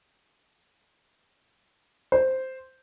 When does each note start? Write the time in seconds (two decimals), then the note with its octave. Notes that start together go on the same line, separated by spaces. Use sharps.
2.12 C5